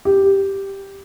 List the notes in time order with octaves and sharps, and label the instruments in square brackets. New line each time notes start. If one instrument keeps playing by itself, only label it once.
[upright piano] G4